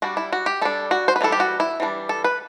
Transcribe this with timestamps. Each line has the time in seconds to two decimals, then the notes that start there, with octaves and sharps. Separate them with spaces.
0.02 G3 D4 F#4
0.17 E4
0.33 F#4
0.46 G4
0.61 G3 D4 A4
0.91 F#4
1.08 C5
1.16 B4
1.21 E3 G3 D4 A4
1.32 G4
1.40 F#4
1.60 E4
1.80 E3 G3 D4
2.09 A4
2.24 B4